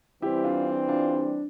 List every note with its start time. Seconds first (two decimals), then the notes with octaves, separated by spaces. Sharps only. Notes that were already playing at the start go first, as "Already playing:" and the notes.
0.22 E3 G3 C4 E4 G4
0.44 D4 F4
0.66 D4
0.88 D4 F4
1.10 D4